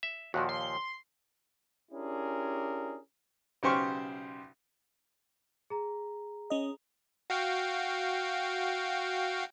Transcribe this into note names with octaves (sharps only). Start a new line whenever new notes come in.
E5
D#2 A#2 F3 F#4
C6
C#4 D4 E4 G4 G#4 A#4
B1 C#3 G4 C5 C#6 F6
G#4 A#5
C#4 D#5
F#4 F5 G5